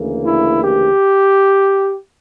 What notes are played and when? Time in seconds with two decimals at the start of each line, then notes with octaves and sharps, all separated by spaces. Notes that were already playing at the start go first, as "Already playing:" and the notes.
Already playing: D2 C#3 E3 A#3
0.25 E4
0.62 G4